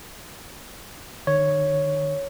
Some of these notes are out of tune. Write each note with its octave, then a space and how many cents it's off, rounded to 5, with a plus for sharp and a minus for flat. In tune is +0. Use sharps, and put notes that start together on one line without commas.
D#3 -40 C#5 +0